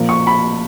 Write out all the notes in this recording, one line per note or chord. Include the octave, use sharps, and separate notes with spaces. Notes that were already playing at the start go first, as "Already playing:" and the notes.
Already playing: A#2 F3 A#3
C#6
B5